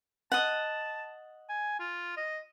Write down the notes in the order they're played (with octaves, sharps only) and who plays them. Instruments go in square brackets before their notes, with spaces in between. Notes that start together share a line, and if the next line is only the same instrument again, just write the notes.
[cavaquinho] D#5 F#5 [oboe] A5
[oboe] G#5
F4
D#5